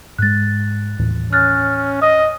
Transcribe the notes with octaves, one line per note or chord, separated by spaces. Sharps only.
G#2 G#3 F#6 A6
D#2 A2 E3
C#4 F6 F#6 A6
D#5 D#6